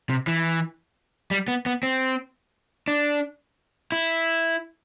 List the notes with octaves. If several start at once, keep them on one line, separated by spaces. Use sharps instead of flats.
C3
E3
G3
B3
B3
C4
D4
E4